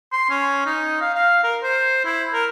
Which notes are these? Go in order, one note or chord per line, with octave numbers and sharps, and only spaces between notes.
C6
C#4
D#4
F5
F5
A#4
C5
E4
A#4